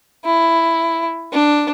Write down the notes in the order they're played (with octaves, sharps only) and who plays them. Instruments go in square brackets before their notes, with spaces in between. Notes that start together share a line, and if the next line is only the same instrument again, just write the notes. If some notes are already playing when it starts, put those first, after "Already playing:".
[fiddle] E4
D4